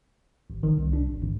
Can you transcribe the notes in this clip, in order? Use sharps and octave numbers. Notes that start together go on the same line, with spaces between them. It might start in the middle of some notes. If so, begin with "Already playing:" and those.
G#1
D#3
C2
D4
G#1
G#1